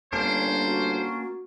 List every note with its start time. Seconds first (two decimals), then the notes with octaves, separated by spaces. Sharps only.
0.13 G1 A#3 C#4 D4 C5
0.65 F#4